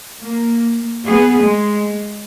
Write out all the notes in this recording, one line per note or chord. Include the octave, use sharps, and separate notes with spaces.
A#3
B3 G#4
G#3